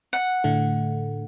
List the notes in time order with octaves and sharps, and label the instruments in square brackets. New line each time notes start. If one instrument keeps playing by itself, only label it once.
[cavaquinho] F#5
[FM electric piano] A2 D3 A3